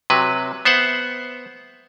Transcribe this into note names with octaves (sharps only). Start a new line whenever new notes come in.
C3 F#3 B4
B3 C5 E5 F#5